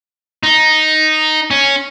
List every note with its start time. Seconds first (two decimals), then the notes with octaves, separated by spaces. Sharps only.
0.43 D#4
1.51 C#4